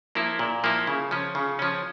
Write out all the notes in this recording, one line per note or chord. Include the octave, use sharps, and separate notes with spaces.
F3 A#3 E4
A#2
F3 A#3 E4
C#3
F3 C#4
C#3
F3 C#4